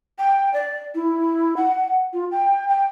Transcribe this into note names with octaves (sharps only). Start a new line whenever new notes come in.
G5
D5
E4
F#5
F4
G5
G5